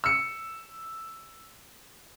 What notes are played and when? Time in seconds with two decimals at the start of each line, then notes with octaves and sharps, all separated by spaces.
0.04 E6 C#7